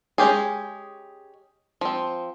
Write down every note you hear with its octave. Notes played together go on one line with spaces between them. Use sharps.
G#3 C#4 G4 G#4
F3 C4